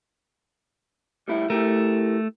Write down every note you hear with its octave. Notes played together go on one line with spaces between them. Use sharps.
G3 A3 E4
A3 E4 G4 A#4